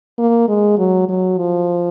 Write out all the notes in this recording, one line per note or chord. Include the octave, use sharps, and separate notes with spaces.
A#3
G#3
F#3
F#3
F3